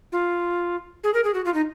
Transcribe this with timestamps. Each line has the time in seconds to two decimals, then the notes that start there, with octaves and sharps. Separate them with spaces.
0.12 F4
1.04 G#4
1.14 A#4
1.24 G#4
1.34 F#4
1.45 F4
1.54 D#4